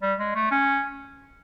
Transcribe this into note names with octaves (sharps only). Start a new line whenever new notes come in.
G3
G#3
A3
C#4